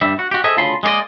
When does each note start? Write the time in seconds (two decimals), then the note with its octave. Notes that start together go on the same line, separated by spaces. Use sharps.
0.01 G2 G3 E5
0.19 F#4
0.31 F#4 G4
0.44 G#4 A4 C5 D#5 E5 G#5
0.57 D2 C#3 F4 A5 B5 C6
0.83 G#3 A#3 C#4 D5 D#5